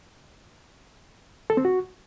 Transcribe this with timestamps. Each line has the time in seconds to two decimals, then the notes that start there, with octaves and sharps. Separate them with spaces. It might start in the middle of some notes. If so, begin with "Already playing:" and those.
1.50 A4
1.57 C4
1.65 F#4